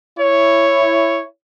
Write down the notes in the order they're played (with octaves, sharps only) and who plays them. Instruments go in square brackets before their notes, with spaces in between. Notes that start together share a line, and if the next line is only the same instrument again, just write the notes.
[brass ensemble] E4 C#5